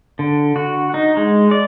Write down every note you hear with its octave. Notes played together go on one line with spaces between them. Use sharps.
D3
F#4
D#4
G#3
D5